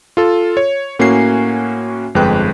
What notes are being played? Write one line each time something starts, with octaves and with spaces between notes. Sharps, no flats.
F4 A4
C#5
A2 A#3 C#4 F#4 G#5 C7
G1 F2 G#3 B4 G5 F#6